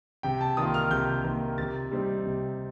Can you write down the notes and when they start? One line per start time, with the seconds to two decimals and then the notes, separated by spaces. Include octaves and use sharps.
0.23 C3 G5
0.41 A5
0.57 D#3 A#3 F4 D#6
0.74 F6
0.91 C3 G6
1.24 D#3 A#3 F4
1.58 C3 A6
1.91 G3 C4 D#4
2.26 C3